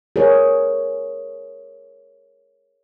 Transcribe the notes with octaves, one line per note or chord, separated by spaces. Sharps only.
G#4 A#4 C#5